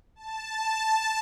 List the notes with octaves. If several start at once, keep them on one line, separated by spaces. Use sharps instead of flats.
A5